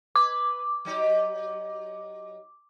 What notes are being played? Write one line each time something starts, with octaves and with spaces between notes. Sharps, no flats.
B4 D6
F#3 D#4 G4